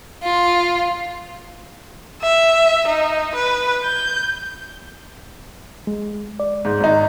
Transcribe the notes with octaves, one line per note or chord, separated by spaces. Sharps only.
F4
E5
D#4
B4
G6
G#3
D5
G#2
G#1 D#4